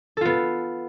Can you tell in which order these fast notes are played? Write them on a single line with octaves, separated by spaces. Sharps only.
A4 F4 B3